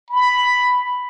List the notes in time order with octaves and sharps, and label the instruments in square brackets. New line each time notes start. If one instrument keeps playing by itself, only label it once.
[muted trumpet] B5